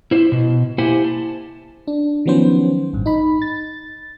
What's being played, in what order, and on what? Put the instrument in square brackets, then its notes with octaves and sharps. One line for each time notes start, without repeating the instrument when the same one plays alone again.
[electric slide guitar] E4 C5
B2
A#3 E4 G4 C5 F#5 G#5
A5
[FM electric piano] D4
D#3 F3 F#3 B3 C#4 C5
A1 G2
D#4 B5
A6